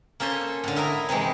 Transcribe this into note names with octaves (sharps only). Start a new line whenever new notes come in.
A#3 C#4 A4 C5 G#5
A2 D3
E4 A#4 D#5 E5 G#5 A#5
C3 D#3 E3 G#3